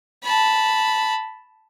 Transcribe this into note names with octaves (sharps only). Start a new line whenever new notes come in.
A5 B5